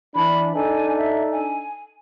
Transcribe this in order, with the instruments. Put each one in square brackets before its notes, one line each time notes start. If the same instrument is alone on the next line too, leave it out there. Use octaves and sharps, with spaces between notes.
[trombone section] E3 D4 [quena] B5
[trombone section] D4 D#4 A4 [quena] G#5
[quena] E5
G#5